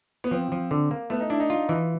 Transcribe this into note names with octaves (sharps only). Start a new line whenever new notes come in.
B3
F3 C4
F3
D3
A#3
A3 B3
D#4
D4 E4
D#4
F4
E3